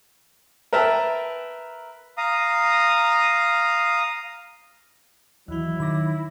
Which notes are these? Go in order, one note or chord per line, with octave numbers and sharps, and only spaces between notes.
A#4 B4 E5 G5 A5
F5 A#5 D#6
D#2 E3 F#3 E4
D#3 B5 D6 A#6